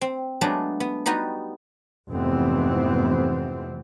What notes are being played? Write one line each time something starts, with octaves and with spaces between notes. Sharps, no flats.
C4
F#3 G#3 A3 B3 D4
B3
G3 B3 D#4 F#4
F1 G#2 E3 B3 C4